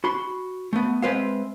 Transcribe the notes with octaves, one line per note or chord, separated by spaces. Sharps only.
F#4 B5 C6
A3 B3
G#3 C4 B4 E5 F5